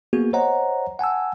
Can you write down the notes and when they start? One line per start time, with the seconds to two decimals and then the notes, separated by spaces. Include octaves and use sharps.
0.13 A#3 B3 F#4 G#4
0.33 C5 C#5 D#5 F#5 A#5
0.99 F#5 G#5 A5 E6